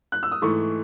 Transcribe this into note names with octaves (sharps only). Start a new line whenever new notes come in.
F#6
E6
D#6
G#2 E3 A3 C#6